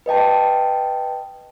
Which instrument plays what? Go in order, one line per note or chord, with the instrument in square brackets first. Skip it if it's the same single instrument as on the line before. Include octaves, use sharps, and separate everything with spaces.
[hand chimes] B4 D#5 G5 A5